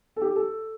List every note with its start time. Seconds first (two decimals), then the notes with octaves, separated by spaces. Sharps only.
0.16 A4
0.22 G4
0.36 A4